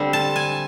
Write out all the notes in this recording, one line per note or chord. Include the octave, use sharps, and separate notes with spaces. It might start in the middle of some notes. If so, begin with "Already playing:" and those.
Already playing: D3 G3 C4
A5
G#5